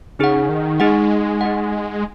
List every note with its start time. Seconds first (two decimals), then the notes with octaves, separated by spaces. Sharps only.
0.19 C#3 D#4 G#4 F#5
0.49 D#3
0.80 G#3 D#4 G#4 F#5
1.41 D#4 G#4 F#5